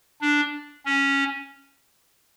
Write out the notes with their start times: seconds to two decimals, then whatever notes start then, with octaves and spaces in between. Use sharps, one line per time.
0.21 D4
0.86 C#4